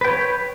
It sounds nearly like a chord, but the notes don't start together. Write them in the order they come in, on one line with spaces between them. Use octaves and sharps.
B4 G5 C#5